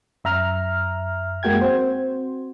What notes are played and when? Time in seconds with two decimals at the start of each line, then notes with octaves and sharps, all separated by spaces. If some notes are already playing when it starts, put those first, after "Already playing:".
0.24 F#2 E5 A#5 F6
1.43 F#2 G#3 A#3 F#4 G5 G#6
1.61 C4 F#4 C5